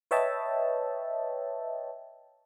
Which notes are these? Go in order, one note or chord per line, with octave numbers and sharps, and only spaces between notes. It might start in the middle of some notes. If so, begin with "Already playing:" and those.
B4 C#5 D#5 E5 G5 A5